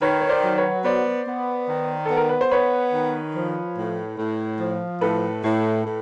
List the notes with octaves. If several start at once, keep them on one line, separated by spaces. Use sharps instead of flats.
D#3 B4 C#5
C#5
C5 D5
F#3
B4 C#5
B3 C5 D5
B3
D#3
A4
B3
A#4
B4
C5
B3 B4 C#5
D#3
F3
A2
A2
F3
A2 A4 B4
A2
A2